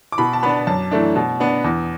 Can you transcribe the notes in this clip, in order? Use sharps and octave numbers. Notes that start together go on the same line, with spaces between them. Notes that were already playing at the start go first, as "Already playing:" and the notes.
D6
B2 B5
A5
B3 D4 B5
F#2 A5
E3 A3 D4
B2
B3 D4
E2